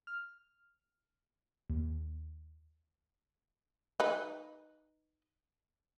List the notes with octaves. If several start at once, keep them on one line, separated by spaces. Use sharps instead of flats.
F6
D#2
D#4 B4